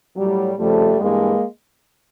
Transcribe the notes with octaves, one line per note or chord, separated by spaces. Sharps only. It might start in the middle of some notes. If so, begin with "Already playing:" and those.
A2 F#3 G3
F2 C#3 F3 G3 A3
G2 E3 G#3 A#3